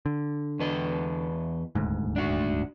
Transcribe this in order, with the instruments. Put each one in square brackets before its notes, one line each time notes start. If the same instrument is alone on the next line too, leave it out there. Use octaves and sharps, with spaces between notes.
[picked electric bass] D3
[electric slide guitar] E2 B4 D#5
[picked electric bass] D#1 D2 G#2
[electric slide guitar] D4 F#4